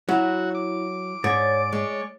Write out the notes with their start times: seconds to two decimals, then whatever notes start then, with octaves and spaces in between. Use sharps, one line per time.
0.09 F#3 E4 F#4
0.55 D6
1.24 G#2 C#5 D5
1.72 G#3 C#5